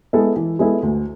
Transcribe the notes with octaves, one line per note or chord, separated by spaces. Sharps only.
G#3 B3 E4 A4
E3
G#3 B3 E4 A4
D2